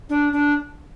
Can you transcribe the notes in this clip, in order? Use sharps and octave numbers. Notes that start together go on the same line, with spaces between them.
D4
D4